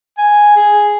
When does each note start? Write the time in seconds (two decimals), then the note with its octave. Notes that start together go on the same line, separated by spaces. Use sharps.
0.18 G#5
0.56 G#4